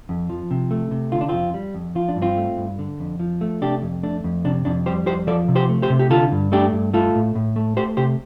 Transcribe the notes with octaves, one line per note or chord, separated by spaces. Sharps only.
F2
F3
C3
A3
C3
D3 F4
D4
F2 C4 F4
G3
F2
F3 F4
D4
G2
C4 F4
A3
G2
D3
F2
F3
A3
C3 D4 G4
F2
A3 D4
F2
C3 D4
F2 D4
G3 G4 C5
F2 G4 C5
F3 A4 D5
C3
G4 C5
A3
G4 C5
C3
G4
D3 F4 A4
G2
A3 D4 G4
G2
A3 F4 A4
A2
A2
A3
A3 G4 C5
C3 G4 C5